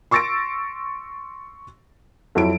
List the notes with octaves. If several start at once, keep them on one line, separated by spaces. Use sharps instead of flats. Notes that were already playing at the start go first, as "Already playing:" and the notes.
C6 C#6 E6 A6 A#6 D7
F2 F#3 E4 D7